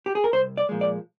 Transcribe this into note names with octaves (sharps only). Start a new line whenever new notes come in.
G4
G#4
A#4
C2 C5
D5
A#2 F3 G#3
D5